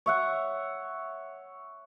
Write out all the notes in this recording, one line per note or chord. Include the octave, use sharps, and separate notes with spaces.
C#5 E5 F#5